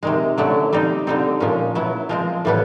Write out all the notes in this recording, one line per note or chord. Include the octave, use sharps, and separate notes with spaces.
C3 D#3 G#3
D3 F#3 A3 C#4 E4
G3 C4 D#4
D3 G3 C4 D#4
A#2 F3 G#3 C#4
F#3 B3 E4
F3 G#3 C4
A2 E3 G3 B3